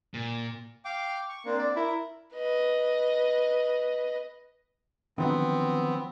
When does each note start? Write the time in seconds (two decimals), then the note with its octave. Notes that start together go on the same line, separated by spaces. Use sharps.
0.14 A#2
0.84 F5 G5 D6
1.29 C#6
1.46 A#3 C4 D4
1.59 D5
1.76 E4 A#4 A#5
2.34 B4 D#5
5.18 D3 D#3 F3 F#3 B3 C4